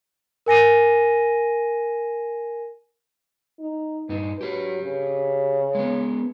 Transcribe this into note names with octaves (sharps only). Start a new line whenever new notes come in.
A#4 G#5 A#6 D#7
D#4
G2 D#4 B4
F#3 G4 B4
C#3
G#3 B3